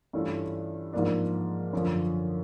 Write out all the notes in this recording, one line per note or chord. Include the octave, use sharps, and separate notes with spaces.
G2 E3 A3 C#4 F4
G#2 F3 A#3 D4
F#2 D3 F3